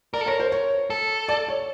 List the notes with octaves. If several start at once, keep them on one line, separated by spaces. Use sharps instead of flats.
A#4 D5
A4
A#4 C#5
C5
C#5
A4
D5
C#5